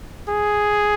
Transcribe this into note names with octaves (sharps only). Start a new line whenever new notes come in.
G#4